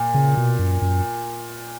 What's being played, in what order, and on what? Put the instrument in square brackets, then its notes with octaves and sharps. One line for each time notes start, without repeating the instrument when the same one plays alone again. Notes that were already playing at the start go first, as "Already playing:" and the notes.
Already playing: [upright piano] A#2
[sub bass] C#3
B2
F#2
F#2